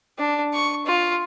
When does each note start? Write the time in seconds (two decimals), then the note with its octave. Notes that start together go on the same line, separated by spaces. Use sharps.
0.19 D4
0.54 C#6
0.86 F4